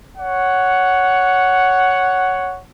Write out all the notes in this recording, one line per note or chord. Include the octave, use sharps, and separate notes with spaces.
C#5 F#5